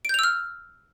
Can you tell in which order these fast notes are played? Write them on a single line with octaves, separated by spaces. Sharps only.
D7 G6 F7 E6 F6